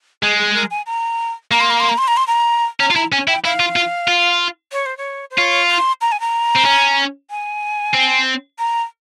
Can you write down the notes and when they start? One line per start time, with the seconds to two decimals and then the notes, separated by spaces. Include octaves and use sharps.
0.23 G#3 G#4
0.39 G#4
0.54 A#4
0.71 G#5
0.86 A#5
1.51 A#3 A#5
1.61 C6
1.70 A#5
1.80 C6
1.89 A#5
1.98 C6
2.08 A#5
2.17 C6
2.27 A#5
2.80 C#4 A#5
2.91 F4
2.95 E4 A#5
3.12 C#4 G#5
3.28 E4 G5
3.44 E4 F5
3.60 F4
3.76 F4
4.08 F4
4.72 C#5
4.86 C5
4.97 C#5
5.31 C5
5.37 F4 C#5
5.70 C6
6.01 A#5
6.12 G#5
6.20 A#5
6.56 C4
6.66 C#4
7.30 G#5
7.94 C4
8.59 A#5